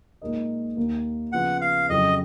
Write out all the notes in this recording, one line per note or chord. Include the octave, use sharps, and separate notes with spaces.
A#2 G#3 D#4 A#4 D#5
D#2 D#3 A#3
C#3 F3 B3 F4 G#4 F#5
F5
F2 C#3 F#3 D#5